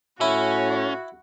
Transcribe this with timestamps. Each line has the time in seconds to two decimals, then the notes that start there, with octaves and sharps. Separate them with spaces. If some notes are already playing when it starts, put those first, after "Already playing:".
0.21 A2 C#4 E4 F#4